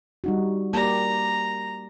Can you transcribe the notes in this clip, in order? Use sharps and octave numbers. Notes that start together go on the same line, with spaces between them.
G3 D#4 F#4
A#3 G4 D5 A#5